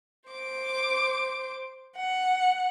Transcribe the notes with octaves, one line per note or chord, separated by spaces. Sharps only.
C5 D6
F#5